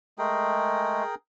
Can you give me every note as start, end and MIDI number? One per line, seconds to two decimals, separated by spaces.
0.19 1.03 56
0.19 1.03 57
0.19 1.15 68
0.19 1.15 70
0.19 1.15 79